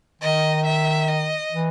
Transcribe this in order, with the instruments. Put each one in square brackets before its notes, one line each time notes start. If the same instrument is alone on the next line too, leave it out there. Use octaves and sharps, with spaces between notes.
[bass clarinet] D#3 [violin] D#5
[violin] E5
D#5
[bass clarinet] E3